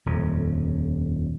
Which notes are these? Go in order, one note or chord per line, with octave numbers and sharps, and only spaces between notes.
D#1 F2